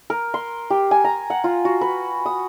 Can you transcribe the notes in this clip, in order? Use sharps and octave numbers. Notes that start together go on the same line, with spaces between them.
A#4
C6
G4
G#5
A#5
F#5
F4
F#4
B4
D#6